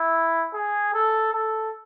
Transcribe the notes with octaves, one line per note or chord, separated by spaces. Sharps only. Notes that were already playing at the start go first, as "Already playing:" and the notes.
Already playing: E4
G#4
A4
A4